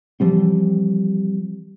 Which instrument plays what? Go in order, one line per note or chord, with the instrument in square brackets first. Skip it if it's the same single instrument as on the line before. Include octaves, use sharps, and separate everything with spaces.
[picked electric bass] E3 F3 G3 C4